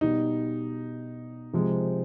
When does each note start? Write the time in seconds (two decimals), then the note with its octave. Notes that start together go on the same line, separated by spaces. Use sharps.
0.01 B2 G3 D#4
1.53 C3 F3 G#3